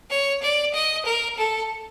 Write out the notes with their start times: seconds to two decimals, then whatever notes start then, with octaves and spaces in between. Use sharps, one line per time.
0.10 C#5
0.42 D5
0.74 D#5
1.06 A#4
1.37 A4